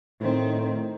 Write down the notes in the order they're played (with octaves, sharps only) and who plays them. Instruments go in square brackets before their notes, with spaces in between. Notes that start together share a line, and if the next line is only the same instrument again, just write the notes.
[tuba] A2 [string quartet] D#3 C4